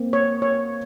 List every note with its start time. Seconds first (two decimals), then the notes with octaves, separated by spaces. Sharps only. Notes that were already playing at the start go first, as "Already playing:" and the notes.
Already playing: A#3 C4
0.13 C#5
0.42 C#5